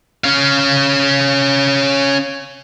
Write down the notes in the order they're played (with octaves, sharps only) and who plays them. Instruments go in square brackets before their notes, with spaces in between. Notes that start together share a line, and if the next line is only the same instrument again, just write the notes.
[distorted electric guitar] C#4 F5